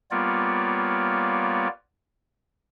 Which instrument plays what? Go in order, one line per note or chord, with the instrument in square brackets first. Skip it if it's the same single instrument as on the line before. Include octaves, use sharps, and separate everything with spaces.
[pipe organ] G3 A#3 B3 F4 C#5 D5